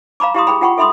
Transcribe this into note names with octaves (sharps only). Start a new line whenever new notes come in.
F5 A#5 B5 D6
E4 G4 F5 A#5 C6 D#6
G#4 G5 B5
F4 F#5 G5 B5 C#6
A4 E5 B5 C6 D#6